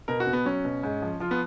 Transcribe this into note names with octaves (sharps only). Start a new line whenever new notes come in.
B2 A#4
F#4
B2
B3
F#3 C#4
B2
G#2
F3
F3 F4
B3